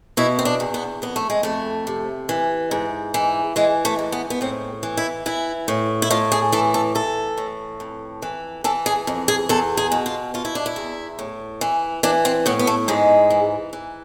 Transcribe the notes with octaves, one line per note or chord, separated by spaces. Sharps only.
B2 E4
C4
D4
E2
B3
F2 B3
A3
G#3
F2 A3
C3
E3
G#2
E3
E3 G#3
A3
G#2
B3
B3
A2 C4
E3
E4
E3 E4
A2
E4
A2 F4
G#4
E3 A4
A4
E3 A4
A2
F2
E3
E3 A4
G#4
F2
G#4
E2 A4
G#4
B2
F4
B2 F4
E4
D4
E4
E2
A2
E3
E3 D4
C4
A2 B3
B3
A3
G#2 G#3
E3
E3